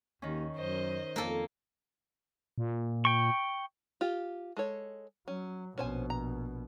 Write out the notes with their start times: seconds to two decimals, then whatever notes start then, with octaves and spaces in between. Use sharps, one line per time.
0.22 D#2 D#3 C#4
0.56 F#2 C5 D#5
1.16 F2 A#3 A4
2.58 A#2
3.05 G5 C#6
4.01 F4 G4
4.57 G#3 A4 C#5
5.28 F#3 C#4
5.78 A#1 B2 C#4 C5 G#5
6.10 A#5